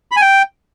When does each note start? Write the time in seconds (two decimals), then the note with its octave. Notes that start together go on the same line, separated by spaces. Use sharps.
0.11 B5
0.16 G#5
0.22 G5